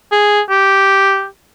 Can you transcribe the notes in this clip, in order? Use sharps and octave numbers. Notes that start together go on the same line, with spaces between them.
G#4
G4